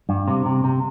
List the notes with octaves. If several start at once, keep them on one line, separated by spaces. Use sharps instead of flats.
G2
C3
C3
C3